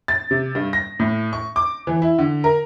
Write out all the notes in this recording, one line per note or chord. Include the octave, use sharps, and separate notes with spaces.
A6
C3
G2
A#6
A2
C#6
D6
E3
E4
D3
A#4